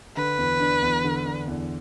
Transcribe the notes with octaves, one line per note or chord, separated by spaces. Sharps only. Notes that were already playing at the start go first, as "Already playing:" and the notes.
D3 B4
E2
D4
E2
D3
D4
E2